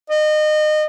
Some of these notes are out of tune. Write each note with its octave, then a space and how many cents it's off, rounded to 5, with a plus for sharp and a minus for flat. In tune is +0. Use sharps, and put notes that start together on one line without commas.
D#5 -30